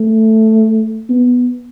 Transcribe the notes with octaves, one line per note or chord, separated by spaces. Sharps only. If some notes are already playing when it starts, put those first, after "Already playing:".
Already playing: A3
B3